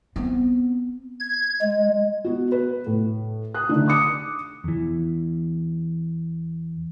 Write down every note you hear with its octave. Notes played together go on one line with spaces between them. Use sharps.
B3 C4
G#6
G#3
B3 F#4
B4
A2
D#6 F#6
D3 A3 D#4
D6 D#6 C#7
E2 E3